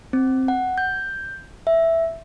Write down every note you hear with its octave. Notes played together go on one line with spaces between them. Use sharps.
C4
F#5
G6
E5